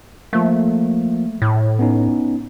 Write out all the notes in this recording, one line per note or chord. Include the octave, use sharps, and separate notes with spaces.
F3 A3 A#3
A2
B3 C#4 D#4